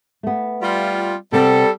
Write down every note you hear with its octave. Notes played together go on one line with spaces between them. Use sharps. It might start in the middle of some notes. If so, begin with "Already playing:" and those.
A3 B3
G3 F4
C3 G3 B3 A4